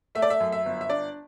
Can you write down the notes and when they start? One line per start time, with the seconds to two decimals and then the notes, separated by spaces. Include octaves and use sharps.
0.15 A3 E5
0.22 D5
0.30 E5
0.40 F#2
0.52 E5
0.66 G1
0.81 E5
0.90 D4 D5